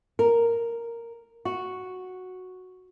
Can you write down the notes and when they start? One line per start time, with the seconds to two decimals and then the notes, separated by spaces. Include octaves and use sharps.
0.19 A#4
1.45 F#4